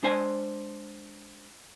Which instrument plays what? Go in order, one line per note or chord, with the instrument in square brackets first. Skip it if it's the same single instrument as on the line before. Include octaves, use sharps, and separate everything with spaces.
[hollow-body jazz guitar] G#3 D4 C5 G#5